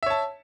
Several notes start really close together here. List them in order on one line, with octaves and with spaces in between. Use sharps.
E5 C#5 A5